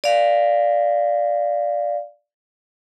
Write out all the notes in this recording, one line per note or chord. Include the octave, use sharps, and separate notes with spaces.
D5 F5